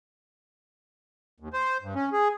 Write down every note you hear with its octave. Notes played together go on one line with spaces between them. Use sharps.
D#2
C5
G2
C#4
G#4